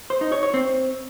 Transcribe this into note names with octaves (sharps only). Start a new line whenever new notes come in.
C5
D#4
C#5
C#5
C4